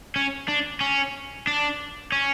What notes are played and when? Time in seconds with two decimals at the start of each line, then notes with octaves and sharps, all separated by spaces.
0.16 C#4
0.48 D4
0.81 C#4
1.47 D4
2.12 C#4